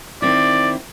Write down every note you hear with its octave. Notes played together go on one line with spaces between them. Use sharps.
D#3 C4 E4 D5